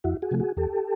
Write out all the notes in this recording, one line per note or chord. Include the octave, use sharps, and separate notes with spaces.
F2 E4 F#4
F#4 G#4
C3 F3 A3
F#4 G#4
E2 G4 A4